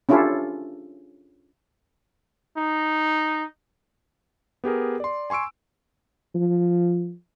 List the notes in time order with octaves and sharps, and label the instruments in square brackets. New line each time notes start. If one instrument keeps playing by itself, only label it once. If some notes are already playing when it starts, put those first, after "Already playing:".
[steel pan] C#4 D4 E4 F4 G4 A4
[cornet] D#4
[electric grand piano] B3 G4 G#4 A#4
D5 C6
G#5 C6 C#6 E6 D7
[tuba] F3